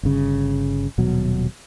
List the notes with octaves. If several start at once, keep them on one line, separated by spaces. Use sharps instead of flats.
G1 C#3
D#1 B2 F#3